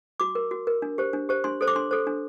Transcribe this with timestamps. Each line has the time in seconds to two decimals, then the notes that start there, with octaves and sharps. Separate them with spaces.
0.20 F#4 D6
0.35 A#4
0.51 F#4
0.67 A#4
0.82 D4
0.98 G4 C5
1.13 D4
1.29 G4 C5
1.44 D4 C6
1.61 A4 C5
1.67 D6
1.76 D4 C6
1.91 A4 C5
2.07 D4